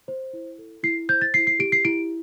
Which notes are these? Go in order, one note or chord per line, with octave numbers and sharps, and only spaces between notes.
C5
E4
A4
E4 C7
C5 G6
A6
E4 C7
C7
G4 D7
C7
E4 D7